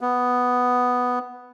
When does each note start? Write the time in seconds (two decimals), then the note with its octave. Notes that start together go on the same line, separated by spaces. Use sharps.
0.01 B3